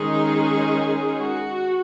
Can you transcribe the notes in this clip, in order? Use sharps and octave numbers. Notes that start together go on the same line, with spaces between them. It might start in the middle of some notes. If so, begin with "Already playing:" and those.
Already playing: D#3 G#3 C#4 D#4 G#4
F#4